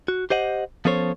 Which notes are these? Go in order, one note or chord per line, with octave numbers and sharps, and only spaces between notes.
F#4
G4 C5 D#5 F#5
F3 B3 C#4 A4 C5 C#5